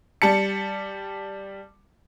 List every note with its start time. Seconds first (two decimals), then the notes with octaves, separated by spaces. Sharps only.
0.22 G3 A5 C#7